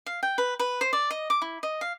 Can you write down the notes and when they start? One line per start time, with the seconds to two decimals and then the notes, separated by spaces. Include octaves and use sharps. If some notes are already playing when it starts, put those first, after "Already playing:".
0.06 F5
0.23 G5
0.38 B4
0.59 B4
0.81 C5
0.93 D5
1.11 D#5
1.30 D6
1.42 E4
1.63 D#5
1.81 F5